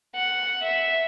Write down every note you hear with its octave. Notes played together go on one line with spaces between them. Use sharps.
F#5
E5